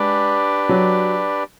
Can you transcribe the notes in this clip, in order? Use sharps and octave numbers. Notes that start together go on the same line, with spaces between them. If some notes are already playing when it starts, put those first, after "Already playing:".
Already playing: G#3 D4 G4 B4 D5
F#3